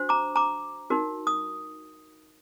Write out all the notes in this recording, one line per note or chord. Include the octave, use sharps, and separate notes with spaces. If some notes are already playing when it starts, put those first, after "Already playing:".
Already playing: D4 F#4 C5
A#5 D6
A#5 D6
D#4 F#4 A#4
D#6